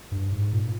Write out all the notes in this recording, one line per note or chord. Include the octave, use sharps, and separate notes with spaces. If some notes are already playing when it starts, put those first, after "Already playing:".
G2
G#2
A#2